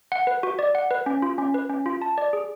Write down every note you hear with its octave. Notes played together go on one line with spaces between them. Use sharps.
F#5
B4
F#4
D5
F#5
B4
C#4
F4
C#4
B4
C#4
F4
A5
D5
G#4